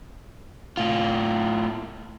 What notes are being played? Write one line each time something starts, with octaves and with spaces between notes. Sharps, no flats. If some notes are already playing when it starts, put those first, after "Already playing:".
A2 F4